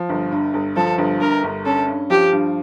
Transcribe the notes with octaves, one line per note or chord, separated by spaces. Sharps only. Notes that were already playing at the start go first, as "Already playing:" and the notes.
Already playing: F3
G1
G2
G1
F3 A4
G1
G2 A#4
G1
C#4 A4
G2
F3 G4
G2